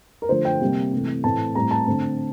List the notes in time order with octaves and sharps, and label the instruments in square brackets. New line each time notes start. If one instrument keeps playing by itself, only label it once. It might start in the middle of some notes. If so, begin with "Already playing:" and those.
[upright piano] A#4
D3 F3 A3 C5
G5
C3 G3 A#3
C3 E3 A3
A2 E3 A3 C4 A5
A2 G3 C4 A#5
A5
D3 A3 C4